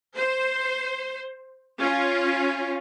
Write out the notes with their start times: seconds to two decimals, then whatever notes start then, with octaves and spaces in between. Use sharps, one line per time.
0.16 C5
1.79 C#4 F4